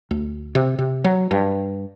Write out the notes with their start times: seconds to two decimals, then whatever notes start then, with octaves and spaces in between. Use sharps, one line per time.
0.11 D2
0.55 C3
0.79 C3
1.04 F#3
1.31 G2